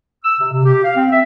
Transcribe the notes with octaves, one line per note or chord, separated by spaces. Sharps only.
E6
C3
C3
G4
F5
C4
E5